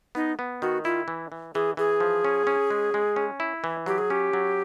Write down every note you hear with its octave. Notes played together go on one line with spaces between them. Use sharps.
B3 D#4
B3
D#3 F#4
E4 F4
E3
E3
E3 G#4
E3 G#4
F3
C#4
C#4
G#3
G#3
C#4
E4
E3
F#3 G4
G#4
C#4 G4
F#3